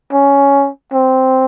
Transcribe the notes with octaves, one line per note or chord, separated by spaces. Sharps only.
C#4
C4